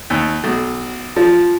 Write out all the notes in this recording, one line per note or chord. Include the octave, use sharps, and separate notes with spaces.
D#2
B1
F3